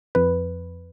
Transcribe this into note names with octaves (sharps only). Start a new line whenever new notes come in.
F2 B4